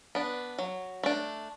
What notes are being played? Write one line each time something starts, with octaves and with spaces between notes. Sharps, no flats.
B3 D4
F#3
A3 D4